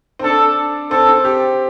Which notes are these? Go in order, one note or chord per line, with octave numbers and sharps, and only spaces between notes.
C4
D4 A4
C4 A4
C4
G4